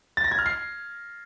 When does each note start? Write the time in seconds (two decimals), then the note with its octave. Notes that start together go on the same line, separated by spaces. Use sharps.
0.17 A6
0.24 A#6
0.31 G#6
0.39 F6
0.46 C7